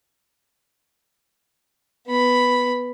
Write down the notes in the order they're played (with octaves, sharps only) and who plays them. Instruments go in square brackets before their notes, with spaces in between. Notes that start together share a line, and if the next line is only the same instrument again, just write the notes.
[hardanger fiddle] B3 B5